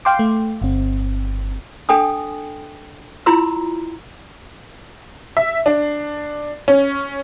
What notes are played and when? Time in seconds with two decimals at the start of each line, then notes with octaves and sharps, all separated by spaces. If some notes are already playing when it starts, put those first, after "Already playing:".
0.05 F5 G5 C6 D6
0.19 A3
0.62 G1 C4
1.89 D4 A4 G5 G#5 D#6
3.26 E4 F4 A#5 C6 E6
5.37 E5
5.66 D4
6.68 C#4